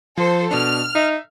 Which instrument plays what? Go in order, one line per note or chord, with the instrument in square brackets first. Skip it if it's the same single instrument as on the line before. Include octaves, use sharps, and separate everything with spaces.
[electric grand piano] F3 [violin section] A4 C5
[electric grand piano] B2 D4 [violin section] F6
[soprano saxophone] D#4 [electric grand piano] E5